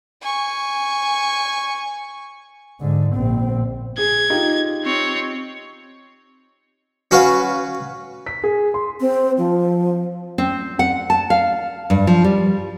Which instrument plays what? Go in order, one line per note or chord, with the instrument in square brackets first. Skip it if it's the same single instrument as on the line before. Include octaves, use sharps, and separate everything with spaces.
[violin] G#5 C#6
[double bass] G#2 D3
A#1 C4
[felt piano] G#4 [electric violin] G#6
[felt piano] D#4 F4 G4
[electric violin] C4 C#5
[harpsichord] C#4 F#4 B4 F5
[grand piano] B6
G#4
C6
[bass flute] C4
F3
[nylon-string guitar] C4
F#5
A5
F5
G2
F3
G3